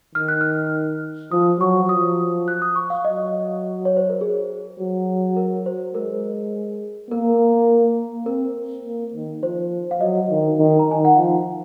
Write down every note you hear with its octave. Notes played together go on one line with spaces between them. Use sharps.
D#3 F6
F#6
F6
F3 D#6
F#3 C#6
F3 D#6
F#6
D#6
C#6
F5
F#3 D#5
C#5
C5
A#4
G#4
F#3
A#4
C5
G#3 A#4
A#3 A#4
C4 A#4
A#3
D#3
F3 C5
F5
F#3 D#5
D#3
D#3
A#5
D#3 G#5
F#5
F3 F5